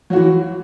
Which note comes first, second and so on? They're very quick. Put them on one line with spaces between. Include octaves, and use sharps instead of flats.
F#3 F#4 E3